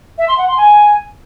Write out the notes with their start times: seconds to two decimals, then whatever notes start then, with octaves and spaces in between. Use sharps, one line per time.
0.18 E5
0.28 C6
0.38 F#5
0.48 C6
0.58 G#5